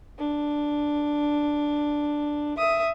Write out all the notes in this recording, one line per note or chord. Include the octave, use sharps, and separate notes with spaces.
D4
E5 D#6